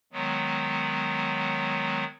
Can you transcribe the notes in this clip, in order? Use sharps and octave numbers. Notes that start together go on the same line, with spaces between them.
D#3 F#3 G#3 B3